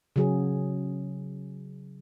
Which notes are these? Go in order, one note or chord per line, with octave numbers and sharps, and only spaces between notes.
C#3 F#3 G#4